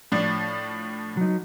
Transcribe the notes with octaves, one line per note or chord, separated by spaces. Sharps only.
A2 F3 D4
F#3 D#4